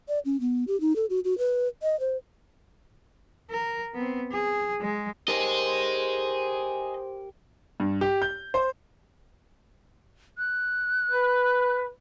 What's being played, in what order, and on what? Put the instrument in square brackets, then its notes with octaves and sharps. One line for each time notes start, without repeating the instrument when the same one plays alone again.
[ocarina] D5
C#4
B3
G4
D#4
A4
F#4
F#4
B4
D#5
C5
[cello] A#4
B3 C4
G#4
G#3
[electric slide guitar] G4 A#4 [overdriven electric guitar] G#4 D#5 [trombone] C5
[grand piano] G2
G4
G6
C5
[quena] F#6
[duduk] B4